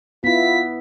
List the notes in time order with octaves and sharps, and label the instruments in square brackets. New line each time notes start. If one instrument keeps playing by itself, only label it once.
[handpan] B3 E4 [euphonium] F4 [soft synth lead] B6